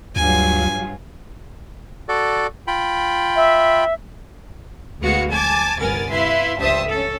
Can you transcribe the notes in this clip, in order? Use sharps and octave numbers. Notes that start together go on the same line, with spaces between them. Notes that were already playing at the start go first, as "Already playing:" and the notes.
D2 G2 F#3 F4 G#5
F#4 A4 D5
F4 G5 B5
E5
D2 G#3 B3 F#4 F5 C#7
G#5 A5 D6 G#6
G1 C2 B3 A#4 G#5 A6
E4 B4 E5 F5 C6
C#2 G2 C5 E5 A5 D#6
C#4 A4